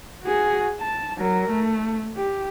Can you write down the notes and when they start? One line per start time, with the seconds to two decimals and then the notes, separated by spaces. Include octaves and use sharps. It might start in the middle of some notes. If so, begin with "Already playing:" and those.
0.22 F#4 G#4
0.81 A5
1.18 F#3 A#4
1.51 A3
2.17 G4